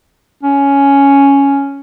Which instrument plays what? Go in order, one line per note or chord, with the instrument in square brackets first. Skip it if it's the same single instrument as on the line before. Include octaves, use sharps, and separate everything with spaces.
[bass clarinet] C#4